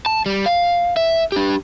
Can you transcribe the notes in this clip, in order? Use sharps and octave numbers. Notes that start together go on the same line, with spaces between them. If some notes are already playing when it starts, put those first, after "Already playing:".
A5
G3
F5
E5
D4 G4